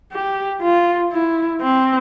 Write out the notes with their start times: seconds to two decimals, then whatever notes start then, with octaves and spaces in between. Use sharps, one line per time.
0.13 G4
0.62 F4
1.12 E4
1.61 C4